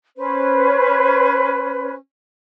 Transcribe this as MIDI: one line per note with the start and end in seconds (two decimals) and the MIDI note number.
0.17 1.94 61
0.17 1.94 71
0.17 1.94 72